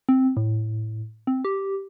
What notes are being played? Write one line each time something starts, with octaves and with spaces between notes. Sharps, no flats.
C4
A2
C4
G4